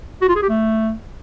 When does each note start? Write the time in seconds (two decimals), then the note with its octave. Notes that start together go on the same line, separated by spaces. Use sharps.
0.22 F#4
0.28 F4
0.35 G#4
0.42 G4
0.49 A3